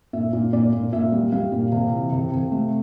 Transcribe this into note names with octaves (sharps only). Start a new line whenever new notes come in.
A#2 E5
A#2
A#2 D5
A#2
A#2 E5
G3
G3 F5
A#2
C3
E3
C3
C3
A3